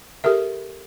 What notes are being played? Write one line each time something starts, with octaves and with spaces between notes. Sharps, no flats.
G4 A4 A#4 E5